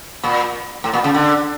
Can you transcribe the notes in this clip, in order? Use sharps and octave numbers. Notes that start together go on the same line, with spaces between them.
A#2
A2
A#2
C#3
D3